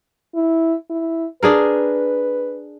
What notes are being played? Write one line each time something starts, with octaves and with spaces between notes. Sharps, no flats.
E4
E4
D4 G#4 A#4 B4